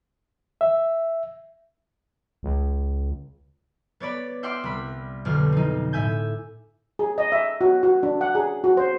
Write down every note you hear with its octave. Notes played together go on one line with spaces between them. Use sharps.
E5
C#2
B3 C#5 D5 B5
E5 F#5 G5 C6 D6 F6
C2 B5
B1 F2 B2 D3 F6
F3 D#4
A2 E5 G#5 G6
G#4
D#5
E5
F#4
F#4
D4
F#5
G#4
F#4
C5